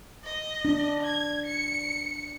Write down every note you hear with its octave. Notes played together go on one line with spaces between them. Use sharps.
D#5
D4
G#6
C#7